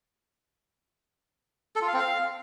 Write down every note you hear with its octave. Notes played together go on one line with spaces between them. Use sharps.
A4
F4
F5
C4
F5